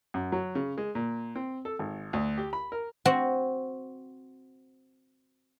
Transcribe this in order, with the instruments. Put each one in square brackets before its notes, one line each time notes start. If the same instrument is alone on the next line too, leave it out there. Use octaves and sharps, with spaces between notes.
[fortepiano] F#2
F#3
C#3
G#3
A#2
C4
A4
G#1
D2
G4
B5
A#4
[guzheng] C4 F#4 F#5